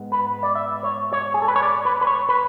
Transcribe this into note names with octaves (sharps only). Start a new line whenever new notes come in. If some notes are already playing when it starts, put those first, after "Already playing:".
Already playing: G#2 G#3 B3
B4
D5
E5
C#5
C#5
G#4
A4
B4
C#5
D5
B4
B4
C#5
B4